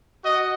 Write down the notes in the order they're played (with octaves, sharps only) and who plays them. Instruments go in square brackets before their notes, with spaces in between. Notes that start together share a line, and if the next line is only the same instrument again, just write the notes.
[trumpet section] F#4 D#5